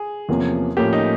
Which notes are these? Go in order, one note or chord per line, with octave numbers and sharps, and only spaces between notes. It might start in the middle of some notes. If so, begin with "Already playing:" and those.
Already playing: G#4
E2 C3 F3 A#3 C#4
A2 F3 A#3 C#4 G4
D#4